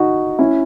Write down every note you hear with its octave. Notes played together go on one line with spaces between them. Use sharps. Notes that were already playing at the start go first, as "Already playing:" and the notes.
Already playing: D#4 F#4
C#4 E4